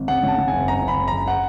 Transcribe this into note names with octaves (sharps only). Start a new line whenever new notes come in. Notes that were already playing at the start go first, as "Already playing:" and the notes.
Already playing: G#1
C#3 F#5
C#3 A5
C#3
G#5
F#1
F#1 A#5
F#1
B5
F#1
A#5
F#1
F#5